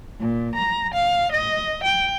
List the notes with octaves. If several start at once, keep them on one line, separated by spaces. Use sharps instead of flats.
A#2
A#5
F5
D#5
G5